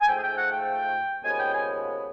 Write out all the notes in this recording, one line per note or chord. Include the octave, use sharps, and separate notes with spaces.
G#5
G#2 F3 A3 G5
G#5
G5
F#5
G5
D#2 C#3 F3 G#3 B3 G#5
G5
G#5